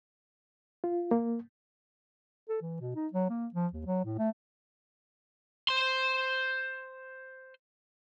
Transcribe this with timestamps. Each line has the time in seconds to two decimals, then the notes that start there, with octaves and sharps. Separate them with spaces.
0.84 F4
1.11 A#3
2.49 A4
2.62 E3
2.80 B2
2.96 D#4
3.13 F#3
3.30 A#3
3.54 F3
3.73 D#2
3.86 F#3
4.05 A2
4.19 A3
5.69 C5 C6